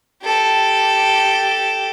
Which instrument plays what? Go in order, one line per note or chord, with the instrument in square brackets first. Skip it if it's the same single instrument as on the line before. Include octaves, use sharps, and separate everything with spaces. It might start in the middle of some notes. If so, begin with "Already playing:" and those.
[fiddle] G4 A4